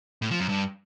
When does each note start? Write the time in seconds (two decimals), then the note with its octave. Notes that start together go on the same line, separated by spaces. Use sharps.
0.22 A2
0.31 F3
0.40 F#2
0.49 G2